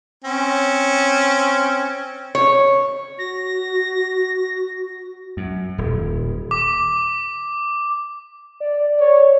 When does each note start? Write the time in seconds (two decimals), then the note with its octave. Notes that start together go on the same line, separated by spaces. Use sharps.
0.25 C4 C#4
2.35 C#5
3.19 F#4 A#6
5.37 F#2
5.78 D#1
6.51 D6
8.60 D5
9.00 C#5